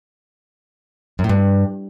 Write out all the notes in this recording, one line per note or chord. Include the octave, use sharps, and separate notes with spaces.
F#2
A2
G2